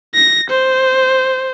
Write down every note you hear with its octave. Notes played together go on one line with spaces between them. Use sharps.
A#6
C5